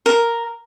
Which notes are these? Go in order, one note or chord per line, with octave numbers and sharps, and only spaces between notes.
A#4